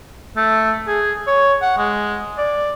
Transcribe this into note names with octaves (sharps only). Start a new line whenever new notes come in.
A3
G#4
C#5
F#5
G#3
D5